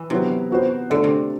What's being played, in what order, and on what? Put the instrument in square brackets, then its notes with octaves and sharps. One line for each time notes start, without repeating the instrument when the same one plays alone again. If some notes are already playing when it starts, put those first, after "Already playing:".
Already playing: [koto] E3
[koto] C3 [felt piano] F#3 B3 E4
[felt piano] B3 F#4 C5
[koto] D3 [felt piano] A3 D4 A4 D5
[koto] C3